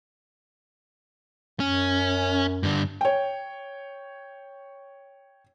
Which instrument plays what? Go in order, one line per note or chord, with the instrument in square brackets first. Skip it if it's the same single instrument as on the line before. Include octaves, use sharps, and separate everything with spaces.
[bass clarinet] F#2 [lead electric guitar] C#4
[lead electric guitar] G2 D3
[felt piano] C#5 G5